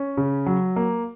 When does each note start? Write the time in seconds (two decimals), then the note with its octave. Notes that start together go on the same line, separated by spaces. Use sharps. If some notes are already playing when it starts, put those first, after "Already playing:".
Already playing: C#4
0.17 C#3
0.46 F#3
0.76 A#3